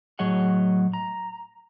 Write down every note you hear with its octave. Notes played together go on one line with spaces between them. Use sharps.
A2 F#3 G#4 C#5 D#5 F#5
A#5